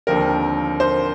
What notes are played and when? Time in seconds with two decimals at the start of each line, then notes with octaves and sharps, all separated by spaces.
0.07 D#2 D3 F3 C4 G4 A#4
0.80 C5